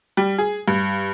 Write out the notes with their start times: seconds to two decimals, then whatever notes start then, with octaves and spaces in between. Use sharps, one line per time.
0.17 G3
0.38 G#4
0.68 G2